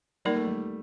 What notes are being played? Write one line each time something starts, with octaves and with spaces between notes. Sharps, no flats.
G3 A#3 D#4 A#4 D5
A3
G3